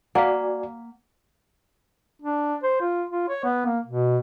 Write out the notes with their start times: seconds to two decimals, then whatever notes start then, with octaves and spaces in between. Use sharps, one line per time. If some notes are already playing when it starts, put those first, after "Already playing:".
0.15 A#3 F#4 D5 F5 F#5 G#5
2.22 D4
2.63 C5
2.80 F4
3.10 F4
3.29 C#5
3.44 B3
3.66 A#3
3.86 B2